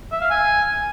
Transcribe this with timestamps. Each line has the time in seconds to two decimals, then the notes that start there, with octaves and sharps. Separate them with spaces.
0.12 E5
0.21 F5
0.30 G#5